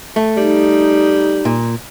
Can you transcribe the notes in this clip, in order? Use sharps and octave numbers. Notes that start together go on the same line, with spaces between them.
A3
G3 D#4
A#2